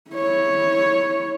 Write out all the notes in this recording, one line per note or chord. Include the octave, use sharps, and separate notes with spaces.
E4 C#5